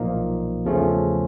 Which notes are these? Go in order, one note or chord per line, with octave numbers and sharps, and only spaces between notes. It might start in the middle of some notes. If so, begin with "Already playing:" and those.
Already playing: B1 A#2 F3 A#3 D#4
E2 C#3 F3 A3 C#4